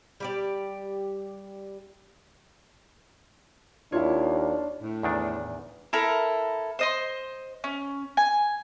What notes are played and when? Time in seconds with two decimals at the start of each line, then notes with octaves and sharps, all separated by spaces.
0.20 G3 G4 D5
3.92 D#2 D4 E4 F4 C#5
4.82 A2
5.03 E2 D#3 D4
5.93 E4 A4 A#4
6.79 C5 D#5 C6
7.64 C#4
8.17 G#5